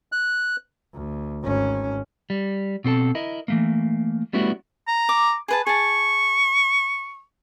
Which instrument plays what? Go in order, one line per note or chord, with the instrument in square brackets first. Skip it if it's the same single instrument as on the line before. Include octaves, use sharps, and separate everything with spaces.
[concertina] F#6
[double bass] D2
G#1 C#4
[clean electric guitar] G3
B2 C4 A4 A5
E4 A#4 D#5
E3 A3 A#3
G3 A3 B3 C#4 E4 F#4
[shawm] A#5
[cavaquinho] D6
G#4 B4 A5
[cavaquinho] G#4 A5 [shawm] C#6